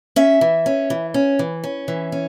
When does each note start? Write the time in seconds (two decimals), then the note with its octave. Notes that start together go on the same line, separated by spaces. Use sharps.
0.16 C#4 E5
0.41 E3
0.66 C#4
0.90 E3
1.14 C#4
1.39 E3
1.64 C#4
1.88 E3
2.12 C#4